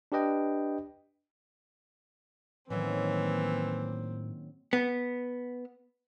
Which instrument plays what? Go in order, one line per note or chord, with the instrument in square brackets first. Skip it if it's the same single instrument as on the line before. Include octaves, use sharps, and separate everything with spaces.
[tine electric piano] D4 G4 B4 D#5 G5
[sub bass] A2 [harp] D#3 F#3 C#4 [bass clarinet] E3 [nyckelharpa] A#3 C4
[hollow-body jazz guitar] B3